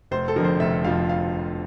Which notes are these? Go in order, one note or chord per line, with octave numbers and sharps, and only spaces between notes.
F1 C5
A4
F2 D3 F3 A#4
C5
F1 E5
F2 D3 F3 F5
F5